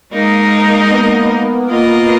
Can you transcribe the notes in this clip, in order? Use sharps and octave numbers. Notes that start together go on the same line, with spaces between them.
G#3 A#3 D#4 A#4 D#5
B3
A#3 F4 A#4 D#5